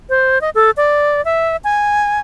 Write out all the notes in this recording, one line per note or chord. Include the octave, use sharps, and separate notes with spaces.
C5
D#5
A4
D5
E5
G#5